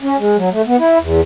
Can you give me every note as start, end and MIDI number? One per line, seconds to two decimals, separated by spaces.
0.01 0.17 61
0.18 0.36 56
0.37 0.49 54
0.51 0.62 57
0.67 0.77 59
0.79 0.98 64
0.99 1.21 40